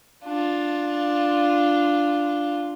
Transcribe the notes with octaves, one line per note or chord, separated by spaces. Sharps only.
D4 F4